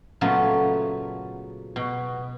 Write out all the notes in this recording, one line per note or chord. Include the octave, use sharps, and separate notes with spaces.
A#2 C#3 F#3 A3 B3
B2